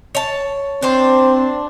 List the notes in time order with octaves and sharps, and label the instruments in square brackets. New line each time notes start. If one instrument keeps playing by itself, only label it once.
[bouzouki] C#5 A5
[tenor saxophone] C4 [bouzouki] D4 C5